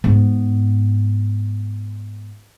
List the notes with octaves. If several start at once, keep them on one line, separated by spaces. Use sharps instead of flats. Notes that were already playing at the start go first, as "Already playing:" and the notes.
G#2 B3